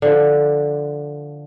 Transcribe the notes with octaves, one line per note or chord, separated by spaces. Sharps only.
D3 F3